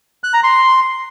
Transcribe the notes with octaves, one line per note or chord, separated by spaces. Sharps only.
F#6
A#5
C6